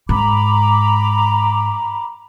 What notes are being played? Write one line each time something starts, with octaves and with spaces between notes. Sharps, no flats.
G#2 A#5 B5 D6